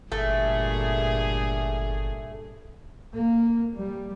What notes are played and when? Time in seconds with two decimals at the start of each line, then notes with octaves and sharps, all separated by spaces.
0.12 G1 G2 A#2 A3 G#4
3.13 A#3
3.76 G3